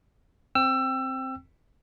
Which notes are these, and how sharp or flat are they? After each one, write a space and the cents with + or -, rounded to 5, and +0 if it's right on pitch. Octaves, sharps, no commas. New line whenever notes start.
C4 +5 G5 +0 E6 +25